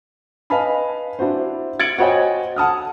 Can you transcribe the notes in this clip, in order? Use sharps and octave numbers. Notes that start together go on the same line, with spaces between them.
B4 D#5 F5 G#5 A5 B5
D4 E4 F#4 C5
G#6 A6 C#7 D7 F#7
F#4 C5 C#5 D#5 G5 G#5
F#5 A5 D#6 F6